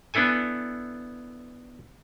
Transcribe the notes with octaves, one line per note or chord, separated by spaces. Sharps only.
B3 D4 E4 A4 G#5